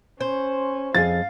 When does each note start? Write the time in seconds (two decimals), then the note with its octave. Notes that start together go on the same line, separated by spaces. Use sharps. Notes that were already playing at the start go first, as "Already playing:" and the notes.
0.21 C#4 C5
0.95 F2 G#4 F5 A6